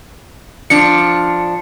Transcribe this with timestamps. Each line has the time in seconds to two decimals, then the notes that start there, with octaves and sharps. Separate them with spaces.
0.70 F3 D4 C#7